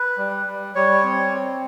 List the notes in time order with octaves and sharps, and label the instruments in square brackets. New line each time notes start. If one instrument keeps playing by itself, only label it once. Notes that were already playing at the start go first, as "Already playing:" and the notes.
Already playing: [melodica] B4
G3
G3
G3 C#5
C4
C4